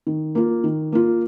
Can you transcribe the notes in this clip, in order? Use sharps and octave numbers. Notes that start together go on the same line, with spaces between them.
D#3
A#3 F4
D#3
A#3 F4